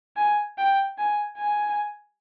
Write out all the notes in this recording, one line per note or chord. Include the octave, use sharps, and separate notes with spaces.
G#5
G5
G#5
G#5